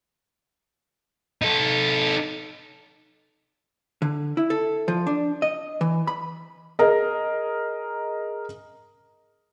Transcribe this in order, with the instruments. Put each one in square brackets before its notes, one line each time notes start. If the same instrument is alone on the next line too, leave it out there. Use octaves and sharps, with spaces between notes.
[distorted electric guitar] D#4 A4
[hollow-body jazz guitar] D3
E4
A4
F3
D4
D#5
E3
B5
[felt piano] G#4 A#4 D#5